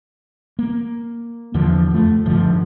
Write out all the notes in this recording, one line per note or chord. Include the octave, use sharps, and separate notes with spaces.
A#3
E2 D3 F3
F2 A3
G1 G#2 D3 F3